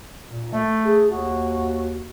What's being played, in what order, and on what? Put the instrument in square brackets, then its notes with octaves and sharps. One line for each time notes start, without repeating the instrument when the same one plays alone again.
[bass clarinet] A#2
A3
[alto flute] G#4
[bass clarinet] D#2 [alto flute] F#4